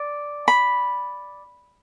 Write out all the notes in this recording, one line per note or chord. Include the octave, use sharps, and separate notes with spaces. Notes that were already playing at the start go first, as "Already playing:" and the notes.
Already playing: D5
B5